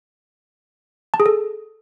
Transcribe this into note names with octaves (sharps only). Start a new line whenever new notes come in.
A5
G#4
A4